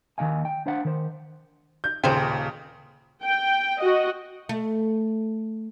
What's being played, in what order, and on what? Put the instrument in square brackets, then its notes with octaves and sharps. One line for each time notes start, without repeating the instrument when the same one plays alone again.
[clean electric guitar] D#2 D#3 C4 D#5 F5 G#5
G5
D4 C5 F5 F#5
D#3 C5
[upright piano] G6
[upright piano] D#1 C#3 [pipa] G#3 C5 G5
[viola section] G5
F#4 D#5
[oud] A3